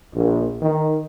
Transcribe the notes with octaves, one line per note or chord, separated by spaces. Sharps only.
A#1
D#3